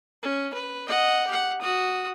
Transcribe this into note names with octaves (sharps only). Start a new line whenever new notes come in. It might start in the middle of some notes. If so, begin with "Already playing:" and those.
C#4
B4
D#5 F#5
G4 F#5
F#4 D#6